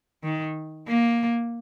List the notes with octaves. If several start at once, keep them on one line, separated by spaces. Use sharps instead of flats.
D#3
A#3